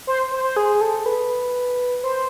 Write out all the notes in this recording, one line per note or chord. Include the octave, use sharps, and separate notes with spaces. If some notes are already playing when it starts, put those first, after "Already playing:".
C5
C5
C5
G#4
A4
B4
C5